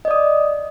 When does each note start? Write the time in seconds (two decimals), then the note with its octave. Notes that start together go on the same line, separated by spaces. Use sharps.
0.05 D#5
0.08 D5
0.11 D#6